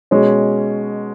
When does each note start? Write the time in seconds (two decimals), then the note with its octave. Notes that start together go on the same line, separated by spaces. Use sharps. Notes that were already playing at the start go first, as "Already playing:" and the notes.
0.11 B2 G#3 C#4